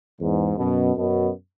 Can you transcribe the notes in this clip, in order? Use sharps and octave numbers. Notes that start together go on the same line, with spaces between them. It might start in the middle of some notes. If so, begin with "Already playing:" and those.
E2 G#2
F#2 B2
F#2 B2